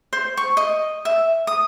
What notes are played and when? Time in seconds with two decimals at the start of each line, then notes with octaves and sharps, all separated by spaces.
0.13 C5
0.37 C#6
0.57 D#5
1.05 E5
1.47 D#6